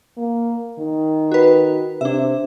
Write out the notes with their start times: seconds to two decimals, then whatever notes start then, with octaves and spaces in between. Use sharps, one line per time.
0.17 A#3
0.79 D#3
1.32 F#4 B4
2.01 C3 D4 E5